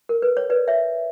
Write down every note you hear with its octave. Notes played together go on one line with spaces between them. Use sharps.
A#4
B4
C#5
B4 D5
C#5 E5